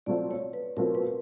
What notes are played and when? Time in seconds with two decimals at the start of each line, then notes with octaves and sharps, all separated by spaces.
0.06 B2 F#3 A3 C4 F4 D5
0.31 C#5
0.53 B4
0.77 B2 F#3 A3 C4 F4 A#4
0.95 B4